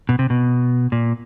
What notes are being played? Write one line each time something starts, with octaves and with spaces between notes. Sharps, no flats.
B2
C3
B2
A#2